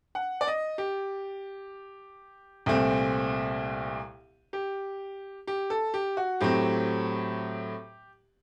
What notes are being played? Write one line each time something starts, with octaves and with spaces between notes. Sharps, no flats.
F#5
D5
D#5
G4
C2 A#2 A3 C4
G4
G4
A4
G4
F#4
A2 F#3 C4 G4